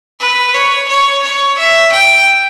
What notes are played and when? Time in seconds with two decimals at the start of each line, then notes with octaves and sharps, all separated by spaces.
0.20 B4
0.54 C#5
0.88 C#5
1.23 C#5
1.58 E5
1.92 G5